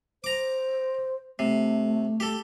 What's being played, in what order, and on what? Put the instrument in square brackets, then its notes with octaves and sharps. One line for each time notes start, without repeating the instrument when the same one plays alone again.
[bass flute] C5 [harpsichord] A#5 D6
[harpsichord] C3 [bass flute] A3
[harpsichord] G4 A4